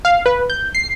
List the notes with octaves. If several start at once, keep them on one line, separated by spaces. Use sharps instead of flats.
F5
B4
G6
C7